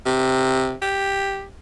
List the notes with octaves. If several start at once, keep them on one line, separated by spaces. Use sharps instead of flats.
C3
G4